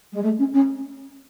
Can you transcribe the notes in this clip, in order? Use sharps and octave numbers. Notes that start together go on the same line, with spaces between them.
G#3
A3
C#4
C#4